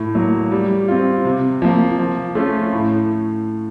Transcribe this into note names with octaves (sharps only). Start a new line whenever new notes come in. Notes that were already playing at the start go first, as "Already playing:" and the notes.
Already playing: A2
F#3 A#3
G3
C4 F4
C3
F3 A#3
F3
A3 C#4 F4
A2